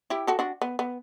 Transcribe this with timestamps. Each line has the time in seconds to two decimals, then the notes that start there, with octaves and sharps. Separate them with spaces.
0.10 E4 G4
0.27 F#4 A4
0.39 D4 F#4
0.62 B3
0.79 B3